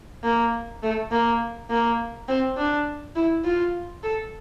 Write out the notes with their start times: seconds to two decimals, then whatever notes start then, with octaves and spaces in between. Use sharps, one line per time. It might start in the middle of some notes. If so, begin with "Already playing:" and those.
0.24 A#3
0.83 A3
1.11 A#3
1.70 A#3
2.28 C4
2.57 D4
3.16 E4
3.44 F4
4.03 A4